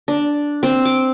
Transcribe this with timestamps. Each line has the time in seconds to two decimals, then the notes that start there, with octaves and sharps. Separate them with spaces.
0.08 D4
0.63 C4
0.85 D6